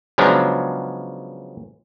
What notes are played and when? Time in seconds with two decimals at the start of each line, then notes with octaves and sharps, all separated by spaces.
0.18 C#3 F3 F#3 G#3 B3 D4